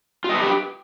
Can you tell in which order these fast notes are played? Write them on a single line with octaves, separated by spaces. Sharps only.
F4 D#5 B4 G4